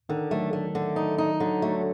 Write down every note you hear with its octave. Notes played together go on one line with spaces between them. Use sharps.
D3 D#3
F#3 A3
A3
D3
D#4
D#4
D3 F#3
F#3 A3